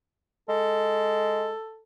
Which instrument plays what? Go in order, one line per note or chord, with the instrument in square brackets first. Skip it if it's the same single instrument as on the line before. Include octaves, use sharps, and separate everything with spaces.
[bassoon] G#3 [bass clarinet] A4